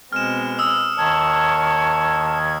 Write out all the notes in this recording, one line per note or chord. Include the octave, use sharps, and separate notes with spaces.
B2 G#3 C4 F6 E7
D#6 E6
D#2 D#3 C#5 A5 G#6